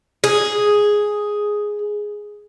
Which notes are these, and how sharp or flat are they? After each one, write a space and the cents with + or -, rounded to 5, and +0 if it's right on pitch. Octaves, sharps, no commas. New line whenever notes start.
G#4 +0